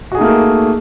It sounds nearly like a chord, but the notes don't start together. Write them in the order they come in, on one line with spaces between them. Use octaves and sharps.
F#4 G#4 D#4 A3 A#3